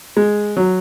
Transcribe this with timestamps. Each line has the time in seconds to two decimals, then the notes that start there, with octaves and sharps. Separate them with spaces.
0.17 G#3
0.57 F#3